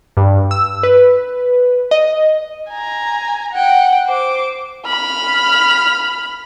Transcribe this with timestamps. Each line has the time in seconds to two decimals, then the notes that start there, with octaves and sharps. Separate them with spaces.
0.17 G2
0.51 E6
0.83 B4
1.91 D#5
2.70 G#5 A#5
3.53 F#5 G5
4.07 C5 D6
4.87 B5 F6